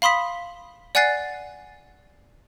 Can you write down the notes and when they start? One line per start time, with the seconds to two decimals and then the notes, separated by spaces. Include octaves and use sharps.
0.02 F5 B5 C6 D#6 B6
0.95 D5 F#5 G#5 F#6 A6 C7